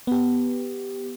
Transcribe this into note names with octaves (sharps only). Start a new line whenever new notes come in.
B3 G4